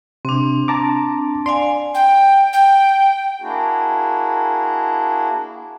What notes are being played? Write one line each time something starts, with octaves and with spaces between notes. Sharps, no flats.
C3 C4 D4
A5 A#5 D6
D5 F5 G#5 C6
G5
G5
A#3 D4 E4 F#4 G#4